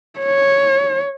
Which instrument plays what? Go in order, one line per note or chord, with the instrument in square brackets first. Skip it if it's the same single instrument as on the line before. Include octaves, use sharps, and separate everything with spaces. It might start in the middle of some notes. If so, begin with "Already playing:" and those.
[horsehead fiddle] C#5